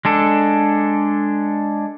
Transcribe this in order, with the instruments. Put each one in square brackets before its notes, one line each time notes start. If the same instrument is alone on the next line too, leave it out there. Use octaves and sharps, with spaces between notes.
[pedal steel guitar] G#3 D4 A4